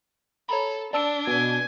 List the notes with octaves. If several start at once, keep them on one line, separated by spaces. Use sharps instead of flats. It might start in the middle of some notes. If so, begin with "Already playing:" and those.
A4 C#5 A#5 B5
D4 D5 A5 E6
B2 G#5